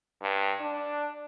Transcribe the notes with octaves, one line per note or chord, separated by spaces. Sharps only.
G2
D4